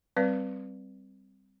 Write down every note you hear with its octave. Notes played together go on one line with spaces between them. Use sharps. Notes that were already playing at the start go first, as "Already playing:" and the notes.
G3 C4 B4 D5